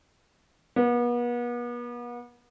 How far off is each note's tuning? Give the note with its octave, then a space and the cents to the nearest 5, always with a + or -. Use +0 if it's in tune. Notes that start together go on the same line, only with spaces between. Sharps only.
B3 -40